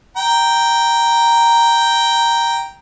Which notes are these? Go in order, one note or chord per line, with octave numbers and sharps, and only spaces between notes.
G5 A#5